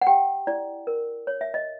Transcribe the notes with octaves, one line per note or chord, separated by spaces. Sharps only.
F#5
G4 G5
E4 D5
A#4
C#5
E5
D#5